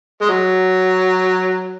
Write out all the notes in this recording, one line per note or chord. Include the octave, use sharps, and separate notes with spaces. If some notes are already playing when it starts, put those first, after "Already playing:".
G#3
F#3